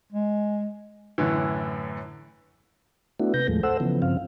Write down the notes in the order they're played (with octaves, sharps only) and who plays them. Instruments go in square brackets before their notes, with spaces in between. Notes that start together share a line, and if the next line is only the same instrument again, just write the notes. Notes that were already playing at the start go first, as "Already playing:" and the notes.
[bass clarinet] G#3
[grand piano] F#2 A2 D3 E3
[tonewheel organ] A3 B3 D4 E4 F#4
C3 B4 G6 A#6
D#2 A2 F3 G#3 A3
A4 C5 F#5 E6
C#3 E3 F3 B3
G2 C#3 F3 C4 F5